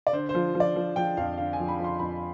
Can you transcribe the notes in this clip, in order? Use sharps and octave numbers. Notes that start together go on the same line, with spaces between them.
D5
D3 C5
C5
F3
F3
D5
F3
F3 G5
F2 F5
D3 F5
G#5
F3
B5
F3
C6
F2 B5